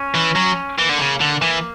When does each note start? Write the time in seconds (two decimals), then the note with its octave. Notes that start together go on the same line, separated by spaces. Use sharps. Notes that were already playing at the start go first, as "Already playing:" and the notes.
Already playing: C#4
0.14 E3
0.36 F#3
0.78 E3 A#3
0.89 D3
0.99 C#3
1.20 D3
1.42 E3